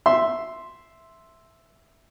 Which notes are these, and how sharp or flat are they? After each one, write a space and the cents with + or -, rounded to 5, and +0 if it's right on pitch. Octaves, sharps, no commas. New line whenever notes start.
E5 +0 C6 +0